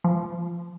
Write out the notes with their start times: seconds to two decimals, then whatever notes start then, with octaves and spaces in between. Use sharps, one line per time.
0.04 F3